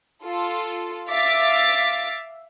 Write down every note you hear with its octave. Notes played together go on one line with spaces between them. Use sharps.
F4 A4
E5 F5 D6 A6 B6